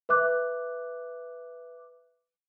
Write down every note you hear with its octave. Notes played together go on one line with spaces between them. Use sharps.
B4 E5 D6 F#6